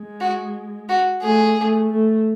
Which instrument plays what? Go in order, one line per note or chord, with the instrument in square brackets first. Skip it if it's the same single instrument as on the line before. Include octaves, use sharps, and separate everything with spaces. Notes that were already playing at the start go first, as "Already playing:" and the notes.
Already playing: [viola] G#3
[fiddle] F#4
F#4
[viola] A3 [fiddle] G#4
[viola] A3
A3